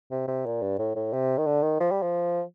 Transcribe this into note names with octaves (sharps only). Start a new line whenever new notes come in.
C3
C3
A#2
G2
A2
A2
C3
D#3
D3
D#3
F3
G3
F3